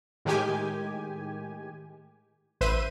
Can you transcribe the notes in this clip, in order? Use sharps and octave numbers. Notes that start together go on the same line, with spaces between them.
A2 D#3 G#3 G4 G#5
A1 B4 C5 E5 D#7